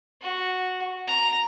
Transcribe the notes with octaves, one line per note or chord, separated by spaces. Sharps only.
F#4
A#5